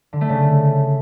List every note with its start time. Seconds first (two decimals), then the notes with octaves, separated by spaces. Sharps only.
0.13 D3
0.21 A3
0.29 C#3